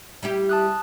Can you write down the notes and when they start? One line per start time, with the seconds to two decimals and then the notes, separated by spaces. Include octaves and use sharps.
0.23 G3 E4 G4
0.49 A5 D#6 F#6